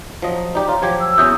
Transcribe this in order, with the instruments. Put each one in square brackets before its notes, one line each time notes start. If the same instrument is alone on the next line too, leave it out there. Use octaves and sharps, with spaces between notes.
[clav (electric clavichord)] F3 F#3 D#5
[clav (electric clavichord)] D#4 G4 [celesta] D5 A#5
[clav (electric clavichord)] F4 [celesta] C#5
[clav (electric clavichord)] F3 F#3 G4 [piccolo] G#6
[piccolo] E6
[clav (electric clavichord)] E2 F#3 C#4 [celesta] E5 D#6 G6